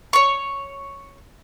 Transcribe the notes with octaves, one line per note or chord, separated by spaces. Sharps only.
C#5 C#6